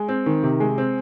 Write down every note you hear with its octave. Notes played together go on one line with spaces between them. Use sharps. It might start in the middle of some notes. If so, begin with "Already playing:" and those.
Already playing: G#3
C4
D#3
C3
G#3
C4